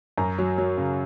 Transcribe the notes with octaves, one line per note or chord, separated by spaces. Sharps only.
F#2 A#5
F#3
F#3
C#3